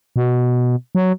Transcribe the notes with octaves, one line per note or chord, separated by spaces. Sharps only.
B2
F#3